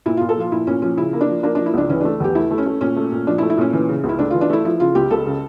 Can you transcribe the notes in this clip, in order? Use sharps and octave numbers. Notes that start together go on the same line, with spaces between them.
A#2 E4
A#2 F4
A4
F3 F4
A#2 E4
A#2 C#4
F3 C#4
C#3 E4
A#3
D4
F3
A#3 D4
F3 D4
E4
C#2 D4
E3 C#4
A3 D4
E2 G4
A3 E4
A3
C#4
A3
A#2 C#4
A3
A#2
F3 D4
E4
A3
E4
A#2 C#4
E3 C#4
C#3
C#2
E4
A3 D4
E3 F4
D4
A3 E4
F3 E4
C#3 F4
C#2 G4
C#2 A4
C#3